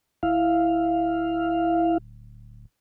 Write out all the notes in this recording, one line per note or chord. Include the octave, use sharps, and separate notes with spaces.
D1 E4 F5